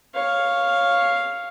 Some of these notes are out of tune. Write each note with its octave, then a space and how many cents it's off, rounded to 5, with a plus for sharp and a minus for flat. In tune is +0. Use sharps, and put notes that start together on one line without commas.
C#5 +0 F5 +0